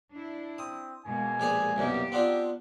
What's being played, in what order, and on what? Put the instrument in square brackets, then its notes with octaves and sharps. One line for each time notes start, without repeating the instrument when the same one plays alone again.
[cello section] D4 E4
[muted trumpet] C4 [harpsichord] D#6
[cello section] B2 G#3 A#3 [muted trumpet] G#5
[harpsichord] A#1 G4 G#4
[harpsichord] C2 F#2 B2 [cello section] A#3 G4
[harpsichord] B3 D4 F4 [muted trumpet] C4